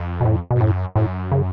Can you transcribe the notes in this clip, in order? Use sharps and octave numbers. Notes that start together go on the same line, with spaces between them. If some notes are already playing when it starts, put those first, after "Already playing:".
Already playing: F2
B2
A2
B2
G#2
F#2 A2
F#2 A2
C#3